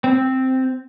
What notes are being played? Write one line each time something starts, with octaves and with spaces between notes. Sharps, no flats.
C4